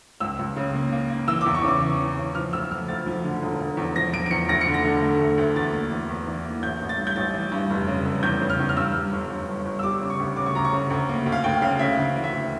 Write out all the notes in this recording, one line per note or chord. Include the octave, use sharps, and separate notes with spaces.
C#2 E6
C#2
C#3
A#3
A#3
A#3
E3 E6
D6
E2
C#6
C#3 D6
E3
E3
C#3
F3 F6
D2 E6
F3 F6
D2 A6
F3
D3
E1
E1
E2
F3 A#6
F3 D7
D7
E2 C#7
D2 A#6
C#7
D3
A#6
D3
A3
D2
D2
E2 A6
A#3
E2
E2
E3
A#3
A1 G6
A1
A6
G2
G6
A1 A6
E3
G2
F1
C#3
F1
E2 G6
C#3
F6
E2
F6
G2 E6
G2
G1
G1
G1
G1
E6
G3 D6
C#3
C#6
D2
C#3 D6
C#6
D2 A#5
C#6
C#3
D2
A#3
D2
F5
D2 G5
C#3 F5
C#3 E5
D2
E3
E5
D2